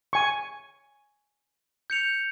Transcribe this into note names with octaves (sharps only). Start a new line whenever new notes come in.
G#5 C#6
G6 C#7 F7